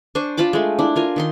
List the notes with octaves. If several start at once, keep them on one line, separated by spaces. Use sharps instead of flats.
D4 C5 G#5 C#6
F4 A5 B5 D6
G#3 A3
D4 E4
F4 A#4 G#5
D#3 D#4 C6